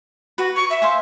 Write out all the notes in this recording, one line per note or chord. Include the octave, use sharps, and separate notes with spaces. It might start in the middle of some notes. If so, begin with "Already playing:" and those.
F#4 B4
C#6
E5
C5 F5 G#5